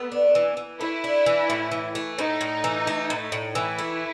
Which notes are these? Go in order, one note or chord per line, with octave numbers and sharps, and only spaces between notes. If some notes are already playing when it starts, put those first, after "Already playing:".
Already playing: A3 B3
D4
E3
E3
A3 E4
D4
E3
A2
E3
A3
A2 D#4
A2
E3
A3
A2
A2
E3 E4
A3